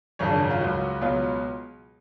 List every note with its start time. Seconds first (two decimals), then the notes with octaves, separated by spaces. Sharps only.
0.19 G#1 F#2 C#3 F3 C#5
0.29 D4
0.40 C#4
0.51 F4
0.60 C#2 C#3 F#3 F#4
1.01 C#2 B2 F#3 F4